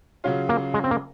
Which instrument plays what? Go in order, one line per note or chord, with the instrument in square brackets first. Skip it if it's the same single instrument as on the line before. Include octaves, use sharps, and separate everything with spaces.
[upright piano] C#3 F#3 C#4 F4
[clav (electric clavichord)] A#3
G#3
C4
A#3